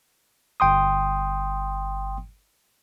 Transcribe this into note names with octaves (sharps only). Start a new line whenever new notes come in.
G1 G5 C6 D#6